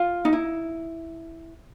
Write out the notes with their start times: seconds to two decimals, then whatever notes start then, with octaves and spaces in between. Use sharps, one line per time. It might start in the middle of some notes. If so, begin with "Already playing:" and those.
Already playing: F4
0.25 D#4
0.33 E4